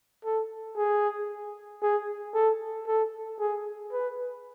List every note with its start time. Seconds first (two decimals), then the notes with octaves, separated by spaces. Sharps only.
0.25 A4
0.77 G#4
1.82 G#4
2.35 A4
2.87 A4
3.40 G#4
3.92 B4